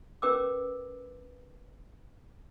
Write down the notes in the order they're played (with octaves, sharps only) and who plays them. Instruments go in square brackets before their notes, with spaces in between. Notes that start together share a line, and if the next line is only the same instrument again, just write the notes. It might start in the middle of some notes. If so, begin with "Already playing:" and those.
[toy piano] C#4 A#4 B4 G5 D6 E6